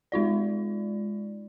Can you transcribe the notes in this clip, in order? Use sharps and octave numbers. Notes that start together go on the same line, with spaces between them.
G#3 D#4 F4 D5